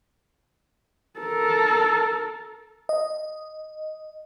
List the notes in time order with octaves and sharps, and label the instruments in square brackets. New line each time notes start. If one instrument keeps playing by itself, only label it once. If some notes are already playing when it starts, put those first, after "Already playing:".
[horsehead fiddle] A4 A#4
[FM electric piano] D#5